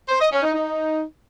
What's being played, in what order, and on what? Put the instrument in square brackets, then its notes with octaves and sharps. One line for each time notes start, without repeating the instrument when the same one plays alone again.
[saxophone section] C5
D#5
C#4
D#4
D#4